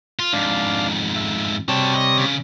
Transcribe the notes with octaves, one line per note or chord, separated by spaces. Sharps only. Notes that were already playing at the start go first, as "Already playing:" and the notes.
F4
F2 G#2 D4 F5
E5
C3 G3 F#4 C#5 A5
D#5
C#3